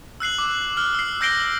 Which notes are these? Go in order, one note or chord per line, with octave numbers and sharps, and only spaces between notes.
E6 F#6 C7 F#7
D6
F6 G7
E6 C7
E6 G6 A#6 C7 D7 G7